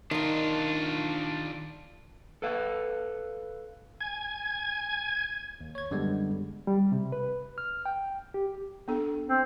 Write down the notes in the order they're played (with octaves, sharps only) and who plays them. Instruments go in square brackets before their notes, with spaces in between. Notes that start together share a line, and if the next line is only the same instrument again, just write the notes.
[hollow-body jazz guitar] D#3 D#4 [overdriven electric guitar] D4 F4
[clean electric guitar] A4 B4 F5
[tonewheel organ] G#5 G#6
[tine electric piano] D#2
C#5 G#6
F#2 D3 G3 G#3 B3
[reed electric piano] G3
C3
B4
F6
G5
G4
[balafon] B3 D4 A4
[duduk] C4